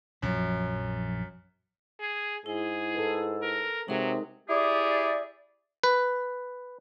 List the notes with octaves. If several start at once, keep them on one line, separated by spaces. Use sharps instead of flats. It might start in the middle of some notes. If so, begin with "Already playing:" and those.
A#1 F#2 F3
G#4
G#2 E4 G#4
A4 B4
A#4
C3 F#3 G#3 D#4 G#4 A#4
E4 G4 G#4 D5
B4